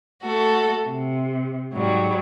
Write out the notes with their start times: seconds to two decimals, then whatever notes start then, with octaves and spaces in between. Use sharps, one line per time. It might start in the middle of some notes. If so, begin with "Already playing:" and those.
0.21 A3 F#4 A4
0.86 C3
1.72 G#2 F#3 G3